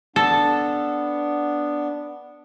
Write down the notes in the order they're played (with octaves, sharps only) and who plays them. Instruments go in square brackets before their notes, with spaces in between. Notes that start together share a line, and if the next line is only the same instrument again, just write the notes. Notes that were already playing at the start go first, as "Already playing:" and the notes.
[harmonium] B3 D4 [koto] A4